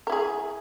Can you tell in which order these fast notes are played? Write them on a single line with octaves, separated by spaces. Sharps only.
A#4 E4 G#4